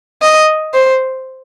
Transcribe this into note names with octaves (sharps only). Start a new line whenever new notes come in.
D#5
C5